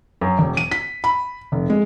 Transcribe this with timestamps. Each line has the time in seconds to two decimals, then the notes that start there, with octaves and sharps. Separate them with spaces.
0.21 F#2
0.39 E1
0.57 D#7
0.71 B6
1.04 B5
1.52 F1
1.70 G#3